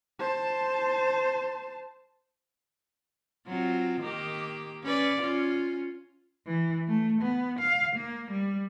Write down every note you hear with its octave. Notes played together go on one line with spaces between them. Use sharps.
C5 A5
F#3 C4 F4
D#3 A#3 G4
C#4 B4 D5
C#4 F4
E3
A3
B3
F5
A#3
G3